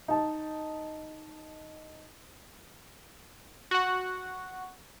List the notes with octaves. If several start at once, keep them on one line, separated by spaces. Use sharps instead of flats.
D#4 A5
F#4 F#5